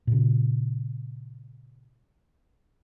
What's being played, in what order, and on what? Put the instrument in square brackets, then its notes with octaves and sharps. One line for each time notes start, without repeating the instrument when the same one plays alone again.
[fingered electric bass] A#2 C#3